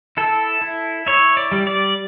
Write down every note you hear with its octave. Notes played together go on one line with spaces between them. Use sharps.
E4 A4
E4
E4 C#5
D5
G3
D5